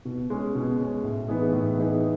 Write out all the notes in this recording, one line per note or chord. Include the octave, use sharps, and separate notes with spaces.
B2
G#3 C#4
B2
G#3 C#4
A2
E3 B3 D#4 G#4
A2
E3 B3 D#4 G#4